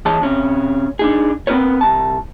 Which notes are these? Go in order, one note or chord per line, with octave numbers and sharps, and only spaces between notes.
E2 E3 G#4 C#5 D#5 A5
C3 C#4
D4 D#4 G#4
B3 C4 D#4 A#4 B4 C#5
C2 A5